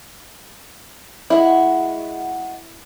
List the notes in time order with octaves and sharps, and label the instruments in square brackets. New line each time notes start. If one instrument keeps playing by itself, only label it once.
[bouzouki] G#3 F#4 [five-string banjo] E4